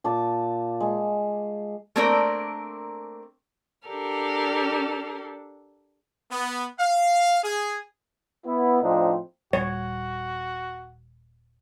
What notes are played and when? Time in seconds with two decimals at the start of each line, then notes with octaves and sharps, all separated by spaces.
0.04 A#2 A5 D6
0.80 G#3
1.96 A3 A#3 C4 D4 A#4 D5
3.87 D4 G4 A4 A#4
6.31 B3
6.79 F5
7.43 G#4
8.45 B3 E4
8.81 A2 F3 C4 D4 D#4
9.53 D#1 G3 F#4 C#5